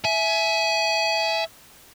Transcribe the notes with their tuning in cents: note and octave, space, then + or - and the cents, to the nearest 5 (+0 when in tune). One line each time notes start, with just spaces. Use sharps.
E5 +0 G#5 +25